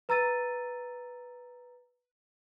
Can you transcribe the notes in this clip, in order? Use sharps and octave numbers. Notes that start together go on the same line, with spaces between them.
B4 A#5 E6 A6 D#7